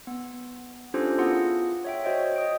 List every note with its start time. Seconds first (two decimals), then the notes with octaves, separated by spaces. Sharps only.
0.07 B3
0.94 C#4 D4 F4 G4 A4 C5
1.18 B3 E4 F4 G#4 F#5
1.85 C#5 E5 G5
2.04 F#4 C5 C#5 D#5 G5
2.36 D#5 D#6 D7